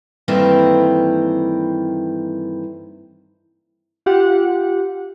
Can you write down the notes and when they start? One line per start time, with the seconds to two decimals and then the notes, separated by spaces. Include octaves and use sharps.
0.28 G2 D#3 E3 A3 A#3 C4
4.06 F4 G4 F#5